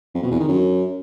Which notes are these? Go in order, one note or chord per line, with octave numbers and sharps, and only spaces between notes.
F2
B2
E2
D#3
F#2